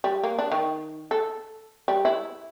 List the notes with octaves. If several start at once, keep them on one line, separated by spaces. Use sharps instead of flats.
G3
A#3
D4
D#3
A4
G3
E4